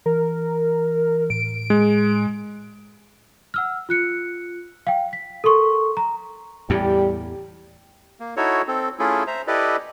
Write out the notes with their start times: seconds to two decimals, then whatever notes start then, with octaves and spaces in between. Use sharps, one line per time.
0.06 E3 A#4
1.30 A2 D7
1.70 G#3
3.54 F#5 E6 F6
3.89 F4 F#6 C#7
4.87 F5 G5
5.13 B6
5.44 A4 A#4 C6 C#6
5.97 A#5
6.70 E2 A2 G3 G4
8.20 A#3
8.37 D#4 E4 F#4 A4 C#5
8.68 C4 A4
8.99 A3 C#4 E4 F4 G#4 A4
9.27 C5 E5 A#5
9.47 E4 G4 A4 B4 D5 D#5